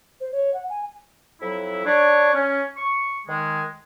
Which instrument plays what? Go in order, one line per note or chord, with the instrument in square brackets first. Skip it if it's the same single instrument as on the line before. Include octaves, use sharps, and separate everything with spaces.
[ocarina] C5
C#5
F#5
G#5
[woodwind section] F2 F#3 E4
D4 C#5
C#4
C#6
D#3 G#3